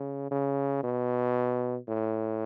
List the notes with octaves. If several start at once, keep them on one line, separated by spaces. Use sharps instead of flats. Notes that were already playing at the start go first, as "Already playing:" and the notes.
Already playing: C#3
C#3
B2
A2